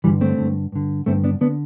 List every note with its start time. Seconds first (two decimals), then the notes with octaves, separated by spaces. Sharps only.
0.04 G2 D3 E3 G3
0.21 A3 C4
0.38 G2 D3
0.72 G2 D3
1.06 G2 D3 A3 C4
1.24 B3 D4
1.41 D3 B3 D4